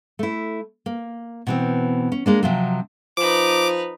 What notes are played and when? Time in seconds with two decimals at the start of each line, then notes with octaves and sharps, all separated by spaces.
0.19 A3 E4
0.86 A#3
1.47 B2 E3 C4
2.12 C#4
2.26 G#3 A#3 D4
2.43 C3 F3 F#3
3.17 F3 D#4 B4 D6